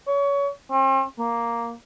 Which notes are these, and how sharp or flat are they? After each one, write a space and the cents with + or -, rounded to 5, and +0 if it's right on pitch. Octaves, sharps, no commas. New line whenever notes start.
C#5 +25
C4 +40
A#3 +0